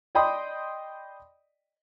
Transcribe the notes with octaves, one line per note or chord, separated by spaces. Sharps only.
D5 D#5 G5 B5 C6 D#6